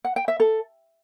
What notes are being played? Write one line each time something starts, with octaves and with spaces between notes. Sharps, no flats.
F#5
G5
E5
A4